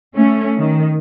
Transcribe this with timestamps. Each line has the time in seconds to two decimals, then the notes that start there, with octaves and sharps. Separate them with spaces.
0.15 A3 C#4
0.57 D#3